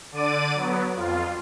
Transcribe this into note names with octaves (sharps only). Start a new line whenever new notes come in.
D3 D5 D6 D#7
F#3 B3
F2 F4